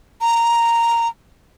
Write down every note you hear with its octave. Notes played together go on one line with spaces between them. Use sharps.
A#5